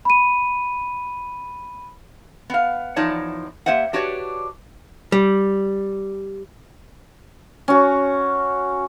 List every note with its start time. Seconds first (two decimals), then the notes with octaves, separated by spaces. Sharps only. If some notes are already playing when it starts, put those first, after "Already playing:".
0.05 B5 D#7
2.50 B3 F5
2.96 E2 F3 D#4 C#5 D5 A5
3.66 A#3 G4 C5 E5 F#5
3.93 D4 F#4 G4 B4 C#5 D5
5.12 G3
7.68 C#4 F#4